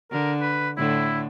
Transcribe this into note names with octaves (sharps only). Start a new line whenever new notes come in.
D3 A#4
B4
A2 D3 E4